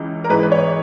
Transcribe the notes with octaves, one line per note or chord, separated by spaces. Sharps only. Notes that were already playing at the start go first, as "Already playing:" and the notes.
Already playing: C#2 C#3 E3
A#4
G#1 G#2 E3 G#3 B4
B4
C#5